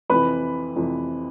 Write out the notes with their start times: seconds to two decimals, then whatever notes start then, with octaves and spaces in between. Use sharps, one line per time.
0.10 F2 C3 E3 B4 B5
0.76 F2 C3 E3